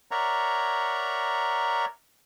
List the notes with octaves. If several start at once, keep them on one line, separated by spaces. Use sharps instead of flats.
A#4 C#5 D5 E5 F#5 A#5